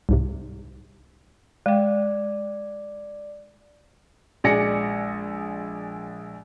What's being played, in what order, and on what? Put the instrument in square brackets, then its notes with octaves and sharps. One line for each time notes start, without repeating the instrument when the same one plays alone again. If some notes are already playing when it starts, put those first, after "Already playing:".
[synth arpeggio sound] C2 G#2 C3
[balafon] G#3 G5 [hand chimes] D5
[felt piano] A#1 G#3 D5 G#5 A#6 C#7